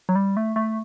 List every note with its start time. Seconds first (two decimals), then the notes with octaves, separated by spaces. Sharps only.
0.09 F#3
0.15 G3
0.37 A3
0.56 A3